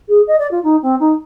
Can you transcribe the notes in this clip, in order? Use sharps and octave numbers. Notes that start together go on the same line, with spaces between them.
G#4
D#5
D5
F4
D#4
C4
D#4